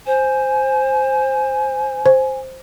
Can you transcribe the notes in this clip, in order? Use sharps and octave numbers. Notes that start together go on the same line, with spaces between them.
C5 G#5
C5